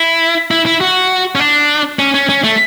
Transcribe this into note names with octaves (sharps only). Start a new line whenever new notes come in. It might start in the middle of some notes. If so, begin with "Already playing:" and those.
Already playing: E4
E4
E4
F#4
C#4
D4
C#4
C#4
C#4
A3